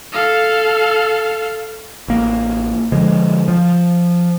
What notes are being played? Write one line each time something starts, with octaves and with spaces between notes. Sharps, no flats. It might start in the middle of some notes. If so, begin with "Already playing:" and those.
A4 F5
A1 A#3
D3 F3 G#3
F3